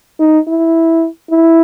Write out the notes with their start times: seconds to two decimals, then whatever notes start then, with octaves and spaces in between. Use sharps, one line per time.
0.20 D#4
0.47 E4
1.31 E4